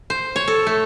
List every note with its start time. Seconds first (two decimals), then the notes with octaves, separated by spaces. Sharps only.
0.10 C5
0.36 C#5
0.48 A4
0.67 A3